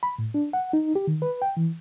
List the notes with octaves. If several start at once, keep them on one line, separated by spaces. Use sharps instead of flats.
B5
A2
D4
F#5
D#4
G4
D#3
B4
G5
E3